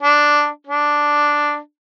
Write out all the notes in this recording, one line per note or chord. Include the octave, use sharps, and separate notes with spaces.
D4
D4